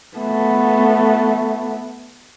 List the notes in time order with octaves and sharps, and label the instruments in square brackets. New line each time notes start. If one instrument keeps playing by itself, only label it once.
[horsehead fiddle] A3 B3